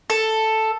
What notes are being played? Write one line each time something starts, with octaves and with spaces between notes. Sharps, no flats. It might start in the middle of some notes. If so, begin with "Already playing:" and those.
A4